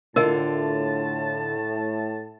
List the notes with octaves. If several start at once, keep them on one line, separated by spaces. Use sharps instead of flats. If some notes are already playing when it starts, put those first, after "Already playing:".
A2 D3 F4 A#4 D#5 A5